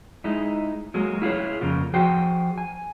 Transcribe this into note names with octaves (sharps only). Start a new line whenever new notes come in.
G#3 D#4 E4
F#3 G#3 A#3
E4 F4 G#4 C#5
F2 C#3 A#3 F4
F3 F#4 G#4 C5 G5
G#5